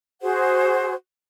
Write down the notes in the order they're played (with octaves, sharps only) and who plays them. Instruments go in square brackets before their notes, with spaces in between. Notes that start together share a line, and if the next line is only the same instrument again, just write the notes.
[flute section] F#4 G#4 C5 F#5